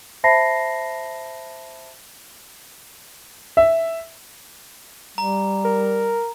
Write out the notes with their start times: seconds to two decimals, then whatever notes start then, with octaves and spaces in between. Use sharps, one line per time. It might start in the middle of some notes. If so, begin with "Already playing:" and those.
0.24 C5 E5 A5 B5 A#6 C7
3.57 E5
5.18 G3 A#5
5.64 A#4